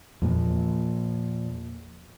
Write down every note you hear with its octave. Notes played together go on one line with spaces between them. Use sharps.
E2 A#2 F3